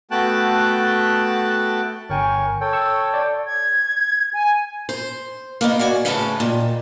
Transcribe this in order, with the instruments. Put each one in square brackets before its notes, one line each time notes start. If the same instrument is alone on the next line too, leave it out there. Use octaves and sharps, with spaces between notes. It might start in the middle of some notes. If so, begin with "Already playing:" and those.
[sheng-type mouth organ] A3 B3 F#4 G5 A5 F#6
[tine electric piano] G1 G5 G#5 [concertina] A#4 C#5 C#6
[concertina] A4 C#5 G5
[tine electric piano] C#6 E6
D5
[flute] G#6
G#5
[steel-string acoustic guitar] C5
A#3 B3 D#4
F#4 D5 G#5
A2 C#3 C#4 A4 B4 A5
A#2 D#3